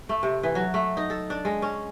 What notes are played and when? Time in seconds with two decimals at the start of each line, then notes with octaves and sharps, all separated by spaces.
0.09 A3
0.23 C3
0.43 E3
0.55 F#3
0.74 A3
0.97 D#4
1.10 A4
1.30 D4
1.45 G#3
1.62 C#4